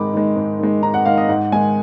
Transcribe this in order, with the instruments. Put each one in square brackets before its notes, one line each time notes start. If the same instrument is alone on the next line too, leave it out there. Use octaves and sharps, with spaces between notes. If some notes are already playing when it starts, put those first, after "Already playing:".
Already playing: [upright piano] G#2 D#3 G#3 B5 D6
D#3 G#3
G#2
D#3 G#3
G#2 A#5
F#5
D#3 G#3 F5
D#5
G#2 F#5
D#3 G#3 G#5